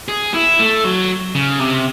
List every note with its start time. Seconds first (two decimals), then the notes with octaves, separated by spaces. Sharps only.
0.08 G#4
0.34 E4
0.59 A3
0.84 F#3
1.35 C#3
1.60 C3